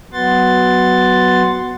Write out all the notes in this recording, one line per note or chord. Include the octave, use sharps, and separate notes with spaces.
F#3 B3 F#5 C6 A6